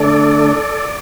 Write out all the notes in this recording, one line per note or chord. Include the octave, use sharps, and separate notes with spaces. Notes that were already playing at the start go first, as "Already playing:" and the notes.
Already playing: D3 A3 D4 A4 D5